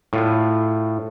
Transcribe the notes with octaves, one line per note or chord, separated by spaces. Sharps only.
A2 F4